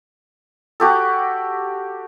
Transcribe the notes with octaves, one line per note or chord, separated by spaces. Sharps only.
F#4 G4 A4